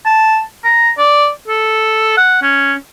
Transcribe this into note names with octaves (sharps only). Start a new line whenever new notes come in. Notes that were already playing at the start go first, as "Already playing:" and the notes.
A5
A#5
D5
A4
F#5
C#4